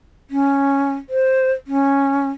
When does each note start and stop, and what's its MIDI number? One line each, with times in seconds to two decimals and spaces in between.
0.30 0.93 61
1.10 1.52 72
1.67 2.29 61